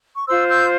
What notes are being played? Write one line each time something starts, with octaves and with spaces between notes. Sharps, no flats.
C#6
F4 C5 C6 E6
E6 G6